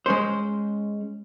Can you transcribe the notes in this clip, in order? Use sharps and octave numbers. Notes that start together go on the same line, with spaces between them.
G#3 C#4 C5